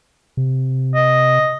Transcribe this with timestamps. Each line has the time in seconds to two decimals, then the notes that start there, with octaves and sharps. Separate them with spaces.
0.37 C3
0.95 D#5